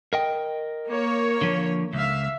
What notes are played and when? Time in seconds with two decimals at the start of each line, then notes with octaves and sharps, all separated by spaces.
0.13 A#4 D#5 G5
0.87 A#3 C#5
1.41 D3 F3
1.93 C#2 E5 F5